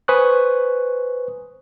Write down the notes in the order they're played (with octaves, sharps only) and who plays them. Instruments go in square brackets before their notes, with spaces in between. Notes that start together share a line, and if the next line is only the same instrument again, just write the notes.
[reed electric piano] B4 C5 G#5 C#6 D#6 F#6